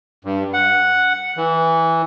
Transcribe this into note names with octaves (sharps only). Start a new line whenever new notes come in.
G2
F#5
E3